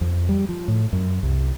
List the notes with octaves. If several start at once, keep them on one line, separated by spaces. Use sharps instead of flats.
F2
G3
F3
A2
F#2
C2